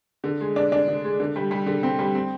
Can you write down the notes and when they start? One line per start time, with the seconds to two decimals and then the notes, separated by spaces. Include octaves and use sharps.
0.24 D3
0.41 G#3
0.56 D4
0.72 D4
0.88 D3
1.04 G#3
1.20 D3
1.36 G3
1.51 G3
1.66 D3
1.83 C4
1.99 G3
2.15 C4